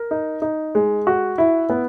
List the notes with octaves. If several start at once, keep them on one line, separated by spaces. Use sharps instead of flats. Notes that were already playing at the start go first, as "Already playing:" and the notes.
Already playing: A#4
D#4
D#4
G#3
F#4
E4
B3